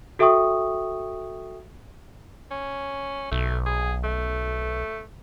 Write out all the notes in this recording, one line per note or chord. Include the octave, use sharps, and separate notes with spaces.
F#4 A4 E5 G5 C#6 D#6
C#4
B1 A3
G#4
A3